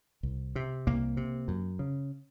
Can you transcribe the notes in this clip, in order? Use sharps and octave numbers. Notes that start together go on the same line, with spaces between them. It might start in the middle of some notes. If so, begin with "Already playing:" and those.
C2
C3
C2 A#3
C3
F#2
C#3